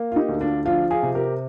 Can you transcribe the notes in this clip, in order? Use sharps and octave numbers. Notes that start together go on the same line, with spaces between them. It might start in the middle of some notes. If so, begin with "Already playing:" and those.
Already playing: A#3
F4
D#4 G4
D2
D4 F4
F3 D4 F4
F4 G#4
C3
G4 A#4